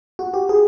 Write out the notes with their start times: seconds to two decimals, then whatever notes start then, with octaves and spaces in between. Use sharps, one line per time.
0.19 F#4
0.34 G4
0.49 G#4